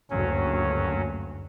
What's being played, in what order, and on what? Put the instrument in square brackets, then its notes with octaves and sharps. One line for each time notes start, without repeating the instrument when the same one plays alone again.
[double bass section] F#1 D2 G2 [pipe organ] F#3 C#4